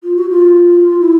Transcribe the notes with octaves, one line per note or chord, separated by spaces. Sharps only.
F4
F#4
F4
E4